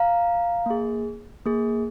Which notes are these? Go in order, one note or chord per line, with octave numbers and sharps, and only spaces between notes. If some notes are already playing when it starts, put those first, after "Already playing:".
Already playing: F5 A#5
A#3 G#4
A#3 G#4